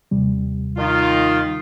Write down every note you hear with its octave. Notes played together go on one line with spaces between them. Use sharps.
D#2 C3 G3
D#3 D#4 F4